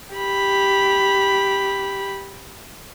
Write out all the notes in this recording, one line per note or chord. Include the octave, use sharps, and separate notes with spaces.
G4 B5